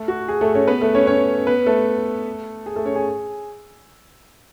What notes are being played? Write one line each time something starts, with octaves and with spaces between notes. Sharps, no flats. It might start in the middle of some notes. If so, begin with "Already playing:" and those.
Already playing: A3 A4
F#4
G#4
A3 A4
C#4 C#5
B3 B4
A3 A4
C#4 C#5
C#4 C#5
B3 B4
A3 A4
G#4
A3 A4
C#4 C#5
G#4 G#5